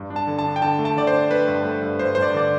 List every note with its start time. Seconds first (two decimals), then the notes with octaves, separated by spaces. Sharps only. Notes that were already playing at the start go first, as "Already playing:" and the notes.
Already playing: G2
0.10 D4
0.16 A5
0.27 D3
0.39 A5
0.45 D4
0.56 G5
0.62 D3 A5
0.79 A3
0.85 A5
0.97 D3 D5
1.07 C5
1.14 D4
1.31 A3 B4
1.48 G2
1.65 A3
1.82 G2
1.99 G2 C5
2.15 G2 C5
2.22 D5
2.34 D3 D5